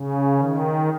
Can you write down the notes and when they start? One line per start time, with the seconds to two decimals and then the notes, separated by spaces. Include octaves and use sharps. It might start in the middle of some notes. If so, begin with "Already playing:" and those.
Already playing: C#3
0.37 D#3